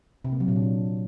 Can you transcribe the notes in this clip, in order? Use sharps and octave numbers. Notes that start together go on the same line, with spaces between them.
C3
A#3
F#3
A#2
D4